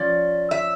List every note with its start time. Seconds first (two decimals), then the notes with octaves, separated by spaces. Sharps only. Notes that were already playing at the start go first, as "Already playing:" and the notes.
Already playing: F3 C#4 D5
0.51 E5